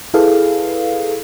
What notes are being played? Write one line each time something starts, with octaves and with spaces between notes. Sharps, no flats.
E4 G#4 A4 B4 F5